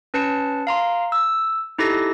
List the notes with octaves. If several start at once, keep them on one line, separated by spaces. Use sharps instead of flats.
C#4 B4 A5 C#7
F5 A#5 C6
E6
D#4 E4 G4 A4 A#6